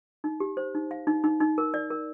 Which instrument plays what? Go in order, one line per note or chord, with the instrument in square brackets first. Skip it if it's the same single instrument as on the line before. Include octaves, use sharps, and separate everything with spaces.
[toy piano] D#4
G4
C5
D#4
F5
D#4
D#4
D#4
A#4
D5
A#4